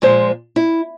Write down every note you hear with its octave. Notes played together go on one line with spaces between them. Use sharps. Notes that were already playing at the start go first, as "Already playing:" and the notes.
A#2 F3 G#3 C5
E4